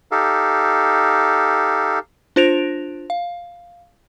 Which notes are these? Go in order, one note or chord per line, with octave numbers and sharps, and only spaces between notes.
D#4 G4 A4 F5
D4 F4 C5 A#6 D7 F7
F5